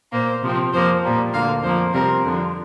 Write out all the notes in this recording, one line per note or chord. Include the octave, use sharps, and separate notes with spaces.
A#2 A#3 C5
C3 F3 C4
F2 F3 A#3 C5
A#2 G3 A#3
D2 D3 A#3 F5
F2 F3 A#3 C5
C3 G3 C4 A#4
F2 D3 F3